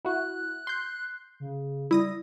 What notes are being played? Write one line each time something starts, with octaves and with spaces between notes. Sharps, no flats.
E4 F#4 F#6
C6 G6
C#3
G3 E4 D#6 A#6